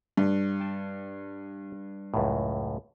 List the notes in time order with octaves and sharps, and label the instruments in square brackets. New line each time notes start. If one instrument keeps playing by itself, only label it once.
[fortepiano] G2
[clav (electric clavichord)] G5 A5
C#2 F#2 A2